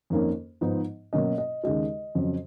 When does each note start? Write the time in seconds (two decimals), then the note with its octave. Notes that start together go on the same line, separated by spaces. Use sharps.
0.10 F2 D#3 A#3 C#4
0.61 G#2 F3 B3 D#4
1.13 B2 F#3 A#3 C#4 D#5
1.38 D#5
1.64 D#2 C#3 G#3 D#5
2.15 F2 C#3 F#3